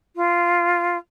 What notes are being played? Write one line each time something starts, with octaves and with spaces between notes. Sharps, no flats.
F4